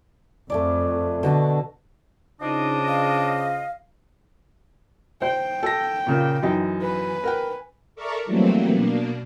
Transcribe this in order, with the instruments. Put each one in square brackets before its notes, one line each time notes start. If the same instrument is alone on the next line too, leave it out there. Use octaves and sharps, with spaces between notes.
[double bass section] F2 [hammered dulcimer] A3 G#4 D5
[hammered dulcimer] B2 F#4 A5 [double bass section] D3
[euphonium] C#3 [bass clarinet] D4 [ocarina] D#4 [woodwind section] F4 C5 D#5
[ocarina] F5
[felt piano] C5 [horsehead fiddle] G5
[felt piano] A4 A#6
A#2 C#3 A#3
F#2 E3 D#4
[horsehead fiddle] B4 G#5
[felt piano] A#4 F#5 G5
[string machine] A4 A#4 D5 E5 A#5 C#6
E3 F#3 G3 A3 A#3 C4
B2 A#3 D4